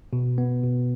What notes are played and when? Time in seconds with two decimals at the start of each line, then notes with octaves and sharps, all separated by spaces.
0.13 B2
0.38 B3
0.64 B2